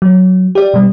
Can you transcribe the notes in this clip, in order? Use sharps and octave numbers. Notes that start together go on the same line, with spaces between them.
F#3
G4 D5
B2 G3